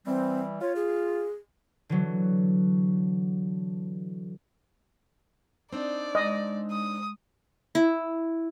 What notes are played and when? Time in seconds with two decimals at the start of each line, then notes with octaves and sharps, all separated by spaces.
0.06 E3 G3 C4
0.61 F4 C#5
0.76 G#4
1.89 D3 E3 F#3
5.73 C4 D4 D#4 D5
6.15 G#3 D#5
6.71 D#6
7.75 E4